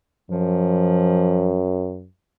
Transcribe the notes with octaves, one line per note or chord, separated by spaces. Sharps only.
F#2 F3